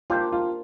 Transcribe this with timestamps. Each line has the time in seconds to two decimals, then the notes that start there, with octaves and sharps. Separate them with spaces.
0.10 A#3 D4 F4 G4 C5
0.32 F4